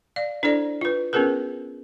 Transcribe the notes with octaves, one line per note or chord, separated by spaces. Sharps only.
D5 F5
D4 E4 A4 C5 D5
F4 B4
B3 C#4 F4 G#4 A#4 B4